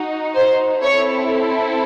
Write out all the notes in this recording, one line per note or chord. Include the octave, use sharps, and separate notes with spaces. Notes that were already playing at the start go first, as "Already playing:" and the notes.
Already playing: D#4 F#4
C5
C4 E4 A4 C#5